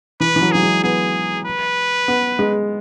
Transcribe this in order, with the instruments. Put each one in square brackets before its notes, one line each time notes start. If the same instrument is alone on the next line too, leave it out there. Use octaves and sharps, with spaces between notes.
[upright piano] E3 [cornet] B4
[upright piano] E3
F#3
[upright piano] F#3 [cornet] G#4
[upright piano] G#3
[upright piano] B3 [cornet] G#4
[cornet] B4
[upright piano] B3
G#3